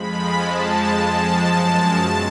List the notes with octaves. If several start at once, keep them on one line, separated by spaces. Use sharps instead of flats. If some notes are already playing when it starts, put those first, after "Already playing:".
Already playing: F2 F3 G#3 B5
F2 F3 G#3 A5
F2 F3 G#3 A5
F#2 F3 G#3
B2 F#3 A5